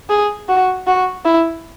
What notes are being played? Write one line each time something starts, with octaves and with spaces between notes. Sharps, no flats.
G#4
F#4
F#4
E4